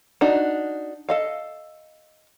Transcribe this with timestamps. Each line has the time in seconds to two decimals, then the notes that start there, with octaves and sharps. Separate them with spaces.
0.21 D4 D#4 F#4
1.09 A4 D#5 F5